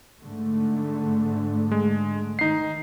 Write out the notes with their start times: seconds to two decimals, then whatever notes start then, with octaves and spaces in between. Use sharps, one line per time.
0.21 G#2 D3 A3
1.72 G#3
2.39 D#3 D#4 C7